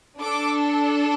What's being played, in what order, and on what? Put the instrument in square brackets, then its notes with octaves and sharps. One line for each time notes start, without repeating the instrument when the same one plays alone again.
[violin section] D4 A4 D6